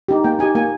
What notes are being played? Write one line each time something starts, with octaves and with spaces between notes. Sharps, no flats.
D#4 G4
A#3 G5
D#4 G4 G#5
A#3 G#5